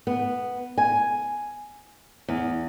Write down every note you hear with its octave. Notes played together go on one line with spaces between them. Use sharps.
B3
G#5
E2